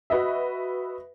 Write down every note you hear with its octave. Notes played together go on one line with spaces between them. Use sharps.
F#4 B4 D#5 E5